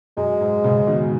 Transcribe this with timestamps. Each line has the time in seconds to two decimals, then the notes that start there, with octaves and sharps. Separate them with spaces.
0.17 F#2 G#3
0.41 G#2
0.64 G#2 C#3
0.87 B2 D#3